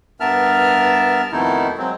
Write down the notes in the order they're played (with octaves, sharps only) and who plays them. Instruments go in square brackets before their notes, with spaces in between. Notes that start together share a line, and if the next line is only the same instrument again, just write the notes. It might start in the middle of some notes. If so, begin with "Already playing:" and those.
[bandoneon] G2 B3 A#4 E5 A5 F6
F2 B2 D#3 A3 D#4 E4
F#3 G#3 C4